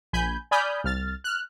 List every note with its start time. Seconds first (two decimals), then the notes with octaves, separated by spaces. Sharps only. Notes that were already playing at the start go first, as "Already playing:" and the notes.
0.13 A#1 G#5 B5 G6
0.51 D5 G#5 B5 D#6 F6 G6
0.84 C2 F6 A6
1.24 F6 F#6